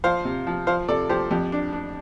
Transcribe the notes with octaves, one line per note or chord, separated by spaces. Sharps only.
F3 C5 F5
C3
F3
F3 C5 F5
C3 A4 D5
F3 G4 C5
F2 G4
D4
D4